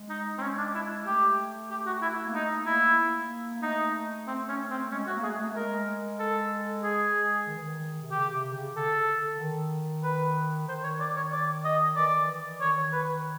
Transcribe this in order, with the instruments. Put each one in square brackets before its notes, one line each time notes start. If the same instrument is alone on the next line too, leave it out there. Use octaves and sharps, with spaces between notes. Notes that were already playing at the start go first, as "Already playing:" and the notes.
Already playing: [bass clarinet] G#3
[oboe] D#4
C4
C#4
D4
E4
[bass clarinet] A3 [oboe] G4
[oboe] G4
F#4
E4
[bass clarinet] A#3
[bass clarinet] A3 [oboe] D#4
[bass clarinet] A#3 [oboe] E4
[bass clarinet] A#3
A#3
[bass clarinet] A3 [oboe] D#4
[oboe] C4
C#4
C4
[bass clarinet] G#3 [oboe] C#4
[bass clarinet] A3 [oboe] F#4
[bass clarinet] A#3
[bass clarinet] A3 [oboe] G#4
[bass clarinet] A3
A3
[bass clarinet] G#3 [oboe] A#4
[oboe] A4
G#4
[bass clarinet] D#3
E3
D#3
C3
[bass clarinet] C#3 [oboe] G4
[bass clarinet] C3
C#3
[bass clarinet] D3 [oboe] A4
[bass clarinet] D#3
[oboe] B4
[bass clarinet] D#3 [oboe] C5
[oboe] C#5
D5
C#5
D5
D#5
[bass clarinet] E3 [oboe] D5
[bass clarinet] E3
[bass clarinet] D#3 [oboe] C#5
[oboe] B4